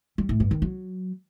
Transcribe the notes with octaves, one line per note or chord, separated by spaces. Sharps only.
G3
A2
G2
D#3
F#3